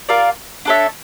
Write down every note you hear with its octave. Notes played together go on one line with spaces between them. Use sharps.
F4 A#4 D5 F5
D4 A4 C#5 E5